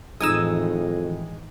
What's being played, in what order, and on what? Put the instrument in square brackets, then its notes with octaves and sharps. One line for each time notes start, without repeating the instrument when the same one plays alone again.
[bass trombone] F2 [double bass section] A2 D#3 E3 [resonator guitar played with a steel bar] G#3 D#4 [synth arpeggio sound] D#6 E6